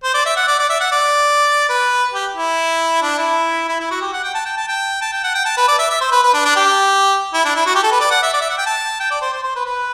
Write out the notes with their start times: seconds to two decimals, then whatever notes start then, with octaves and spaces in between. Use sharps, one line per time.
0.04 C5
0.14 D5
0.26 E5
0.36 F#5
0.48 D5
0.59 D5
0.70 E5
0.81 F#5
0.92 D5
1.69 B4
2.14 G4
2.35 E4
3.02 D4
3.18 E4
3.69 E4
3.80 E4
3.91 F#4
4.01 G4
4.13 F#5
4.24 G5
4.34 A5
4.46 G5
4.57 A5
4.68 G5
5.01 A5
5.12 G5
5.24 F#5
5.35 G5
5.45 A5
5.57 B4
5.68 D5
5.79 E5
5.90 E5
6.01 C5
6.12 B4
6.23 B4
6.34 D4
6.45 D4
6.56 G4
7.34 E4
7.45 D4
7.56 E4
7.66 F#4
7.75 G4
7.83 A4
7.92 B4
8.00 D5
8.11 F#5
8.23 E5
8.33 D5
8.41 E5
8.50 F#5
8.58 G5
8.66 A5
9.00 G5
9.11 D5
9.22 C5
9.33 C5
9.43 C5
9.55 B4
9.65 B4